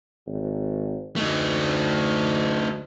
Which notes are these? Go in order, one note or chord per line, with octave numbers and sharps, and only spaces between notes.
G#1
D2 A3 D#4